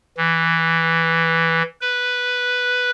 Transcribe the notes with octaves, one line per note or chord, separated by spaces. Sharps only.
E3
B4